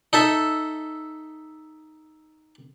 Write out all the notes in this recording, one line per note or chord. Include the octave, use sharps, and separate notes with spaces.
D#4 A4 E5